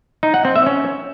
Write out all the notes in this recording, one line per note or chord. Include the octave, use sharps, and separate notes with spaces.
D#4
F#5
C4
E5
C#4